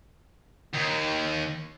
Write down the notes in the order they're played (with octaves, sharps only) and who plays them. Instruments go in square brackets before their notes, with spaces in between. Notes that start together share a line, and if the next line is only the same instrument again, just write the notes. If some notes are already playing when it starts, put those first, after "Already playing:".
[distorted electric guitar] D#2